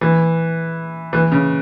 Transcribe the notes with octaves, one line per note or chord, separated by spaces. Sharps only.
E3
E3
C#3